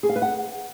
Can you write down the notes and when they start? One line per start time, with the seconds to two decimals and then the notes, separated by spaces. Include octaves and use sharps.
0.03 G#4
0.09 F5
0.16 B4
0.22 F#5